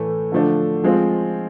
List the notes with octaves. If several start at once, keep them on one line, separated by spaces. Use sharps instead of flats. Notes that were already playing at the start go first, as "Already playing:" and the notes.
Already playing: A2 E3 A3
D3 F3 A3 D4
F3 G#3 C4 F4